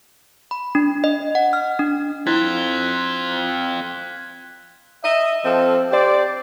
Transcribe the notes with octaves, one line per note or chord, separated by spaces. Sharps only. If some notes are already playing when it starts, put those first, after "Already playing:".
B5
D4
D#5
F#5
F6
D4
C4 E4 F4 F#6 G#6 B6
D#5 E5
F3 C4 A4
G4 C5 D5